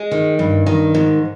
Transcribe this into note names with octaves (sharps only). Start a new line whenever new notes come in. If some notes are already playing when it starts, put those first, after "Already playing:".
Already playing: G#3
D#3
G2
D#3
G#2